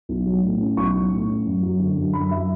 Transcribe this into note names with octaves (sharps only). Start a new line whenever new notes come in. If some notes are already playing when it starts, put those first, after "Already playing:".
B1
F#3
A2
C#4
B1 C#6
F#3
A2
C#4
F#2
F#3
D3
F#2
F#2 B5
F#3 E5